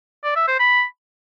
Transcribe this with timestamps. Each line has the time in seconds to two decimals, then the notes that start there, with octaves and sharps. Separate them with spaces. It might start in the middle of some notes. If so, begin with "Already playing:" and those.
0.24 D5
0.36 E5
0.48 C5
0.59 B5